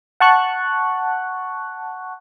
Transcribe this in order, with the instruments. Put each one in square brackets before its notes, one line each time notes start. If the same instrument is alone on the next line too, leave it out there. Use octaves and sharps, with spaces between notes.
[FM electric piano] F#5 A5 C#6 F#6